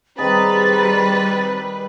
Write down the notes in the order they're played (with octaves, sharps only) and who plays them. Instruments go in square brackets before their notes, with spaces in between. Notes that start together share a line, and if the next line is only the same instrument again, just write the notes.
[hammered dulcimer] D#3 G#4 [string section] G3 B4 [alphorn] C4 [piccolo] A6